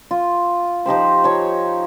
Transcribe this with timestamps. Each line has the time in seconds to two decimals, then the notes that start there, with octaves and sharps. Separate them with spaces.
0.11 F4
0.86 F3 D#4 G4 C5
1.24 F3 C#5